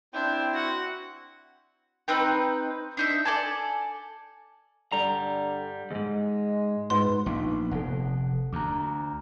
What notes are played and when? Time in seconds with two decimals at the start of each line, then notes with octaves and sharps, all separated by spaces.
0.14 C4 D4 E4 G5
0.54 F#4 F#5
2.08 C4 D#4 B4 G5
2.97 D4 D#4 E5
3.25 A4 D5 G#5 A5
4.92 G2 D3 G3 A#5
5.91 D#2 G#2 G#3
6.90 G#2 B3 C6
7.26 A#1 B3 D#4
7.72 F1 A4 F#5
8.53 D2 A#5 D6